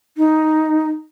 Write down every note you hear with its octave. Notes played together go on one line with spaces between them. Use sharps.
D#4